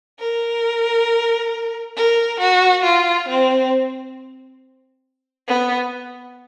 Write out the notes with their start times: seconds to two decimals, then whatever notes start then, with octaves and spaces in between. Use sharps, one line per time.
0.19 A#4
1.96 A#4
2.40 F#4
2.84 F4
3.29 C4
5.48 B3